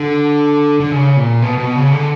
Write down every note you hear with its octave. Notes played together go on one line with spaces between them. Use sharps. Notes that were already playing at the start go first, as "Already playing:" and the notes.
Already playing: D3
D3
C#3
A#2
B2
B2
C#3
D3